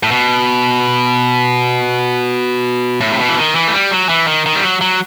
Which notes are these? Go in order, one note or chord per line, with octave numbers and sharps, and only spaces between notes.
A2
B2
A2
C3
B2
E3
D#3
E3
A3
G3
F#3
E3
D#3
D#3
G3
F#3
F#3